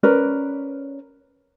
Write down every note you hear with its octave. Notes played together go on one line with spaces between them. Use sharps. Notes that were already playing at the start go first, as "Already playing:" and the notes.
C#4 A#4 B4 D5